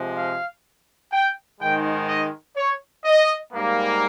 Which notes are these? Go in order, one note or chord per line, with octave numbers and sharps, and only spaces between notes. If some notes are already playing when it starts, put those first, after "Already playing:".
Already playing: C3 F3 G#3
F5
G5
G#2 D#3 G#3 G5
D#5
C#5
D#5
G#2 G3 A#3